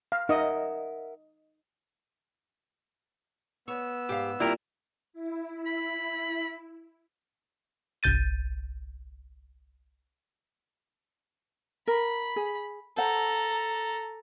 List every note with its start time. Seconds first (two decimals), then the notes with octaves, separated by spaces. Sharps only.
0.12 F5
0.29 D#4 A#4 D#5 E5 F#5
3.68 B3 C#5 E6
4.09 G#2 G4 F5
4.40 A#2 G3 C4 E4 G4 A#4
5.13 E4
5.66 B5
8.03 G1 C2 G6 A6 D#7
11.88 A#4 B5
12.36 G#4
12.97 A4 C5 F#5 A#5